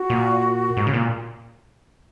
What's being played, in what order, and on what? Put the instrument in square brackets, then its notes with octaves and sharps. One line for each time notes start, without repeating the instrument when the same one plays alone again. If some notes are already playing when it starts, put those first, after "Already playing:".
Already playing: [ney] F#4
[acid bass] A#2
G#2
C#3
A#2